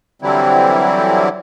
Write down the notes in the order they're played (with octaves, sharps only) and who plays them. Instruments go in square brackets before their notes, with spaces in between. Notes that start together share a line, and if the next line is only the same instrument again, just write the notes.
[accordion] D3 E3 F#3 G3 C4 E4